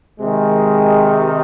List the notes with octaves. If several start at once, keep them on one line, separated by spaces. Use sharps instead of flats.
C3 D#3 G#3